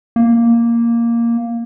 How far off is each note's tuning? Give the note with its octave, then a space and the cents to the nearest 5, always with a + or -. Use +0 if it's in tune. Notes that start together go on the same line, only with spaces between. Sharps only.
A#3 +0